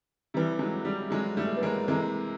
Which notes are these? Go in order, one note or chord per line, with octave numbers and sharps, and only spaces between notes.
C3 E3 G3
F#3 G#3
G3
F#3 G#3
G3 A3
B3
G#3 A#3
C3 E3 G#3 A#3